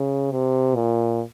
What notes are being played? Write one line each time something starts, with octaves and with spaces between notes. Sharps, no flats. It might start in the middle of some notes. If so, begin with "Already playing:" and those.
Already playing: C#3
C3
A#2